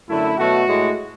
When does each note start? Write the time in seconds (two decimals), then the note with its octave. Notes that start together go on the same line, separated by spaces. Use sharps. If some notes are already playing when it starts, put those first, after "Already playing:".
0.08 F#2 D3 A3 E4
0.38 B2 F#3 A3 F#4
0.68 A2 G#3